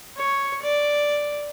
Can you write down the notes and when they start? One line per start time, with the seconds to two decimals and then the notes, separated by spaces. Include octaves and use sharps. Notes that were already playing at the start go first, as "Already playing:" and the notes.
0.16 C#5
0.62 D5